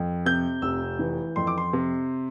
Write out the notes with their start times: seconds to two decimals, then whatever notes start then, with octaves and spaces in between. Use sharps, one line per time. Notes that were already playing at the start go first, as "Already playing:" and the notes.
Already playing: F2
0.26 C3 G6
0.62 F1 E6
0.99 E3
1.36 F2 C6
1.47 D6
1.58 C6
1.73 C3